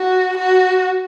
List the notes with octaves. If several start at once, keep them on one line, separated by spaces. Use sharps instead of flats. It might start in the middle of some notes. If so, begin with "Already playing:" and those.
Already playing: F#4
F#4